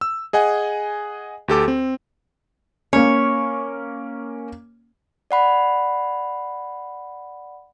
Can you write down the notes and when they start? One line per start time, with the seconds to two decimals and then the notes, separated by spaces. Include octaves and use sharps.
0.01 E6
0.33 G#4 D#5 F#5 G#5
1.48 D2 G4 A4 D6
1.68 C4
2.93 A#3 C#4 C#5
5.31 D5 F#5 B5